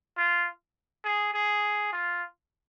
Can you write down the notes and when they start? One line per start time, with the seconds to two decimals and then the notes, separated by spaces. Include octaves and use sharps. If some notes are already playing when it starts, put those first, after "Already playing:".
0.17 F4
1.04 G#4
1.34 G#4
1.93 F4